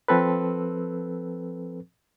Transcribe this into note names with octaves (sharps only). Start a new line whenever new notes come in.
F3 C4 A4 B4